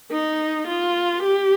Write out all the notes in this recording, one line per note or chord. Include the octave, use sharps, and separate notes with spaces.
D#4
F4
G4